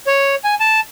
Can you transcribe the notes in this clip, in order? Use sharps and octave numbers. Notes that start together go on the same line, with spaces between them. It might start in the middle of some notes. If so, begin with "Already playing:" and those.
C#5
G#5
A5